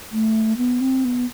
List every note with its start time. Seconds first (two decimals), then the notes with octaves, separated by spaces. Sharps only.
0.12 A3
0.57 B3
0.80 C4
1.05 B3